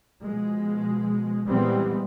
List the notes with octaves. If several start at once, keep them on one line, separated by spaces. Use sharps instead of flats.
B2 F3 G#3
A#2 E3 G3 G#3 B3 C4